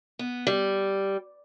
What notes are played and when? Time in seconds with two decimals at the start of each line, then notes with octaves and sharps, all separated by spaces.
0.19 B3
0.47 G3